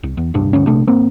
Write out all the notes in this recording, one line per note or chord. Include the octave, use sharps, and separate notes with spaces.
C2
E2
D1 C2 G2 D4
D2 G2 C#4
A#1 C3 A3 D4
G#1 A#3 C4